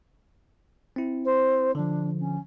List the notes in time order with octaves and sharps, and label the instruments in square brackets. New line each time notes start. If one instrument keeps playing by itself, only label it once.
[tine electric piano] C4 E4
[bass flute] C5
[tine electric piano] D3 F3 [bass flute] D4
[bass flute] C#4